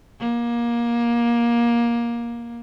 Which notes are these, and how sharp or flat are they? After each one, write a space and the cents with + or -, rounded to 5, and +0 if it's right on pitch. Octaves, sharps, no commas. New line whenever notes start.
A#3 +20